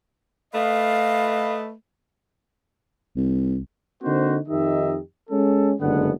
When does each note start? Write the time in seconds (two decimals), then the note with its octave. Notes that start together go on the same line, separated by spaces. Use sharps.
0.54 A3 B4 D#5 F5
3.16 C2
4.03 D3 A#3 C4 D#4 F#4 C5
4.48 F2 D#3 D#4 G4 D#5 E5
5.30 G#3 C#4 A4
5.80 F#1 G2 D3 G#3 B3 F#5